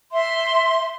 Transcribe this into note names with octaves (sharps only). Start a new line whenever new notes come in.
E5 C6